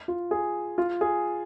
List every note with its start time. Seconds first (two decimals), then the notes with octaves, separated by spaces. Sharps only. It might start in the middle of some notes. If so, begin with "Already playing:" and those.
0.08 F4
0.31 G#4
0.78 F4
1.01 G#4